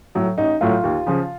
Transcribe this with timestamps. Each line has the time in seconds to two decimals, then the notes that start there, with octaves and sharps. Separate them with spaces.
0.15 A2 F#3 A3
0.38 A1 D#4
0.61 A2 F#3 A3 F4
0.83 D#2
1.06 C#3 F3